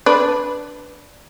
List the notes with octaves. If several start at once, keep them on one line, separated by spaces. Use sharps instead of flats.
D4 B4